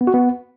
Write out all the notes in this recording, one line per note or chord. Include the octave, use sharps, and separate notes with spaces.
B3
F#4
B3